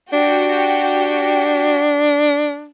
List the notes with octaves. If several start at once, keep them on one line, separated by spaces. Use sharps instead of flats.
D4 F#4 G4 G5